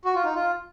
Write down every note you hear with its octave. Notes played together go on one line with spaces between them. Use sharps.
F#4
F4
D#4
F4